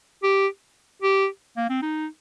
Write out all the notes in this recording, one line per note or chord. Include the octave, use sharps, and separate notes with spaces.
G4
G4
A#3
C4
D#4